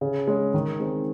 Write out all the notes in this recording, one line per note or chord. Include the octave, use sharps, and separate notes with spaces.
C#3
G#3 C#4
D#3
G#3 C4 D#4